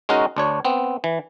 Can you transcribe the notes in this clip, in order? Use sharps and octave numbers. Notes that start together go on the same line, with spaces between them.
G#3 C#4 D#4 F#4 A#4
D2 D4 C#5
B3 C4
E3